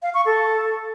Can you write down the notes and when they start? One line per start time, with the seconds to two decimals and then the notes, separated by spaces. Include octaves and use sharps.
0.03 F5
0.14 C#6
0.26 A4